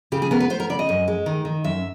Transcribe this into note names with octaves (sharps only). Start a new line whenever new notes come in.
C#3 G4
G#4
B3 A#4
B4
B3 C5
A#4
C#3 D5
D#5
F#2
G#3
D#3
D#3
F#2 E5